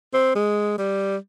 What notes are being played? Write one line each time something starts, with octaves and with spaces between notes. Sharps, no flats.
C4
G#3
G3